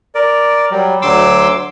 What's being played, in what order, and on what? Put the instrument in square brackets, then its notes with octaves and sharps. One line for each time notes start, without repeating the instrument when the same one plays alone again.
[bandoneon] A#4 D5
F#3 G3
D2 F#3 C6 D6 E6